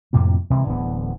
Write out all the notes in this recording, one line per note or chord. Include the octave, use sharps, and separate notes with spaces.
F2 A2 C3 A#3
C3 E3 G#3
D1 D3 E3 B3